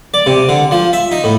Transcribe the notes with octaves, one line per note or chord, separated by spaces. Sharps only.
D5
C3
D3
F3
E5
D#4
A2